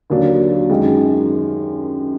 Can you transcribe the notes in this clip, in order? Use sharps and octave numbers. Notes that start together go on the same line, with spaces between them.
D#2 D3 F#3 D4
F#2 D#3 G#3